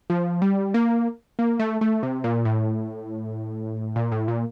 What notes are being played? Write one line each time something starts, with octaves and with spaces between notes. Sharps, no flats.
F3
G3
A#3
A#3
A3
A3
C3
A#2
A2
A#2
A2
A#2